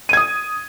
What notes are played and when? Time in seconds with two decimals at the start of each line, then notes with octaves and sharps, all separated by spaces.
0.09 D#7
0.13 G#6
0.17 D#6